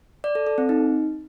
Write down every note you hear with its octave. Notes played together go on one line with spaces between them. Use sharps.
D5
A4
A4
C4
D#4